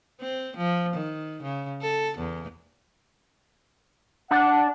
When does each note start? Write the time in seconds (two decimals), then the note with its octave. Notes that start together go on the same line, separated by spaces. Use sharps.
0.21 C4
0.57 F3
0.94 D#3
1.43 C#3
1.81 A4
2.18 E2
4.31 D4 F#5